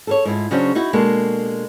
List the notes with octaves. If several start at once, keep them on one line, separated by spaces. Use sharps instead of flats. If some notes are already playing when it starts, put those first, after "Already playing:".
A4 A#4 C#5
G#2 E4 F4
C#3 F#3 C#4 D4 F#4 C5
D#4 E4 F#4
B2 G#3 A#3 D4 F#4 A4